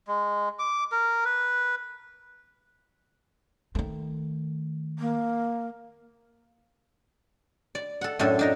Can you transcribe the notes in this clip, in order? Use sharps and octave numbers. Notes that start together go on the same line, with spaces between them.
G#3
D6
A#4
B4
D#3 A3
A#3
D5
A4 F#5
F#2 A2 D4 A4
D4 D#4 A#4